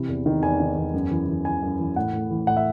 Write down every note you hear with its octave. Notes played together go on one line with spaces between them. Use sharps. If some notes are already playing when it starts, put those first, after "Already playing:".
Already playing: C3 E3
E2
D#3
E2 G#5
D#3
E2
F#2
E3
E3
E3 G#5
F#2
E3
A2 F#5
A2
E3
A2 F#5
E5